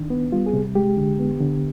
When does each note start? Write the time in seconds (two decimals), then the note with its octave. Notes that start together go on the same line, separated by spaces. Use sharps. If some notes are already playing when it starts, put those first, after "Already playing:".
Already playing: D#3 D4
0.10 B3
0.32 G3 F4
0.46 G#4
0.53 C3
0.75 G#3 G4
0.97 D3
1.19 B3
1.40 D3